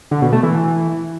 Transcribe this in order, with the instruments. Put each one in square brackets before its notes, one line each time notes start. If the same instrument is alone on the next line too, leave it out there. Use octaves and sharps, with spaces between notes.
[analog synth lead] D3
B2
A3
E3